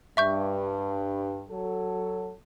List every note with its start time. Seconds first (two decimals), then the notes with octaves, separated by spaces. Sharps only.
0.17 G2 E5 C#6 G6
1.49 F#3 A4